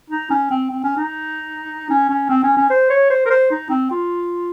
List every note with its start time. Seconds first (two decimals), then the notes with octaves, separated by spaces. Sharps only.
0.10 D#4
0.30 C#4
0.51 C4
0.71 C4
0.84 C#4
0.97 D#4
1.90 C#4
2.10 C#4
2.30 C4
2.43 C#4
2.57 C#4
2.70 C5
2.90 C#5
3.10 C5
3.26 A#4
3.30 C5
3.51 D#4
3.70 C4
3.91 F4